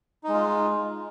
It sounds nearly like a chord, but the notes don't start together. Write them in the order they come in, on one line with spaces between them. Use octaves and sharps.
D#4 G#3 F4